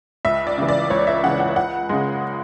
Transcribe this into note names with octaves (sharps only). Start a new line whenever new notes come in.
C#2 E5
D5
C#3 E3
D5
C#2 C#5
E5
C#3 E3 F#5
F#5
C#2 F#5
C#3 G#3